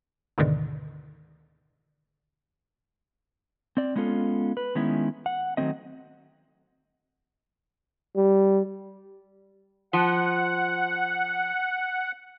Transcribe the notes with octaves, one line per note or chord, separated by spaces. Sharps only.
D2 G#2 B2 D3 D#3
C4 D5
G#3 B3 C#4 F4 A4
B4
D#3 G#3 B3 C#4 E4
F#5
D#3 F#3 A3 C4 D#5
G3
F3 F#5